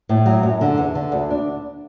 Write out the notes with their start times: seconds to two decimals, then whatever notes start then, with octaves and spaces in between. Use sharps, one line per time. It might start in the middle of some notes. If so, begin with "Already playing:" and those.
0.09 A2
0.26 F#3
0.43 F#2
0.61 D3
0.78 E2
0.95 D3
1.12 D2
1.30 D4